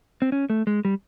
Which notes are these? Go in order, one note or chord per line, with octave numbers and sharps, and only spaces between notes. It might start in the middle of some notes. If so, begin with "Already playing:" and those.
C4
C#4
A3
G#3
G3